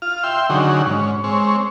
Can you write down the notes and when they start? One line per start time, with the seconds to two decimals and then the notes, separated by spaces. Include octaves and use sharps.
0.02 F4 F6
0.24 E5 G5 C6
0.50 D3 D#3 F#3 C#4 F#4 G#4
0.86 G#2 C#4
1.24 G#3 C4 C#5